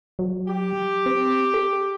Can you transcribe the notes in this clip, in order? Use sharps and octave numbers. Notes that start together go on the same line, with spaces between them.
F#3
G4
C4
A4